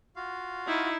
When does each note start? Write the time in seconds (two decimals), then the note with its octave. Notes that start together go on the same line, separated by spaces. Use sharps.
0.16 F4 F#4 F5
0.67 D#4 E4